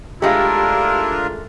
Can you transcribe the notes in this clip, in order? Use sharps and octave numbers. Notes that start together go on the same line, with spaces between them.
G#3 A3 D4 E4 F4 G4 A#4 F5